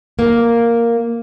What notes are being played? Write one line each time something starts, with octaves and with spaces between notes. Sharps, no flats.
A#3